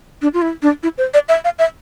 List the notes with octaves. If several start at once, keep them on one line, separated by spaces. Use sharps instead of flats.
D4
F4
E4
D4
E4
C5
D5
E5
F5
E5